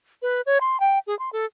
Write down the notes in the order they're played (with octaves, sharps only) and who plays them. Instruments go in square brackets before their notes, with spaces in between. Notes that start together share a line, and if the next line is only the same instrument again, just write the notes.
[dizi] B4
C#5
C6
G5
G#4
C6
A4